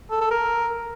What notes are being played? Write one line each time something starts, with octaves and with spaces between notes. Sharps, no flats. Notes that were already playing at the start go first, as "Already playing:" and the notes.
A4
A4
A#4